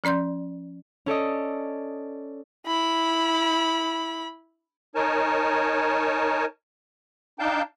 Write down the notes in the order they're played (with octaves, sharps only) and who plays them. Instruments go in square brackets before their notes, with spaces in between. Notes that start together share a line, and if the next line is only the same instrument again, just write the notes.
[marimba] F3 C#4 D5 C6 G6
[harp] C#4 A4 D5 D#5
[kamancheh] E4 B5
[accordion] D#4 A#4 C#5 G#5 A5
D4 D#4 F5 G5 A5 G6